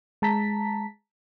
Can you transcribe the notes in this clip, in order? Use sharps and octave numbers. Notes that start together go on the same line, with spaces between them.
G#3 A5 A#5 B6